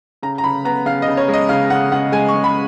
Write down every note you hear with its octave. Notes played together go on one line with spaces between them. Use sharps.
C#3 A#5
A#5
C#3 B5
B3 A#5
C#3 F5
D#5
C#3
C#5
G#3
D#5
C#3 F5
C#3 F#5
C#3 F#5
G#3 G#5
C#6
C#3
B5